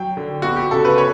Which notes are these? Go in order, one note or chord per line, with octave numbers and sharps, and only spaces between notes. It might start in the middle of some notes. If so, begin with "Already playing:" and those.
Already playing: F#3 G5
D3
B3 F#4
G4
C#3 A4
B4
C#5